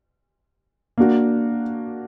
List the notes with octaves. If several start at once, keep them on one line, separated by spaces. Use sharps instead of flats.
A#3 D4 F#4